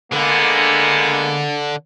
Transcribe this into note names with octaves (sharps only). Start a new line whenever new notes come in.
D3 G#3 A#3 B3